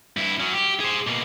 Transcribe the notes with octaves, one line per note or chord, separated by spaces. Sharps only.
G2 E4
F#3 C#4
G4
G#4 C5
B2 A#3